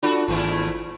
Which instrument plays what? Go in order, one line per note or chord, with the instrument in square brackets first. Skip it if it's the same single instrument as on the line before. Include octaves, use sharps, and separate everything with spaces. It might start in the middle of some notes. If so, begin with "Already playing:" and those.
[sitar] D4 F#4 A4 [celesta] F4 B5
[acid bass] G#1 [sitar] D#2 A3 E4